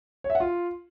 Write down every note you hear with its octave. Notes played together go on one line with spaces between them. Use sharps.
C#5
E5
F#5
F4